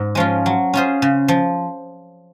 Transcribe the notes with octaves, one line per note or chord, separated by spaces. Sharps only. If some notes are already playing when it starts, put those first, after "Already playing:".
Already playing: G#2
F3 G#3 C#4 F4
F#3
C#4 F4 G#4 C5
C#3
F3